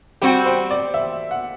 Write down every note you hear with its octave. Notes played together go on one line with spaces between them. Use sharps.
G3 C4 F#4 G4
C5
D5
E5
F#5